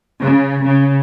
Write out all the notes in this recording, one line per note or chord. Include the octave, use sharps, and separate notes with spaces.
C#3
C#3